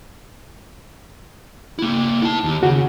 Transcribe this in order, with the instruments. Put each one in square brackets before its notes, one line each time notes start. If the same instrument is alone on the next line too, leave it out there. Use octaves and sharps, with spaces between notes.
[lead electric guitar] A#3 E4
E4 A5
D#2
[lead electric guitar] C#3 [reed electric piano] F#4